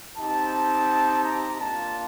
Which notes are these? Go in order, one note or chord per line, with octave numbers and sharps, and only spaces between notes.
C4 D#4 G4 A5
A#5
A#3 D4 F4 A5